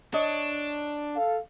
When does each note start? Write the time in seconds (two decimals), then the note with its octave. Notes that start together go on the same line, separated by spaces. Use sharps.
0.14 D4 C#5 D#5
1.16 A4 F5